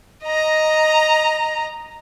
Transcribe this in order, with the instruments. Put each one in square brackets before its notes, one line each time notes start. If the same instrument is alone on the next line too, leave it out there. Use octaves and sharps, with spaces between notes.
[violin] D#5 A#5